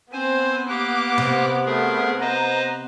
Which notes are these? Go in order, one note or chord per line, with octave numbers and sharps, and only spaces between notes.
B3 C4 C5 G#5
A#3 G4 D6 F#6
C3
A3 G#4 A#4
B4 C5 D#5 A#5